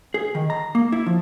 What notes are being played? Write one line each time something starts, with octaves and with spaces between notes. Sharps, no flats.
G#4
D#3
A#5
A#3
E4
F3